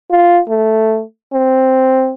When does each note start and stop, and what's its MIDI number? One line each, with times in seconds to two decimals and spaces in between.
0.10 0.40 65
0.48 1.02 57
1.33 2.13 60